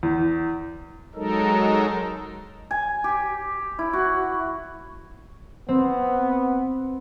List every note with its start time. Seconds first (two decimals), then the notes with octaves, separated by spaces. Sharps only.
0.03 E2
1.14 F#3 G#3 D#4 A4 A#4
2.71 G#5
3.04 G4
3.79 E4
3.93 F#4
5.69 B3 C4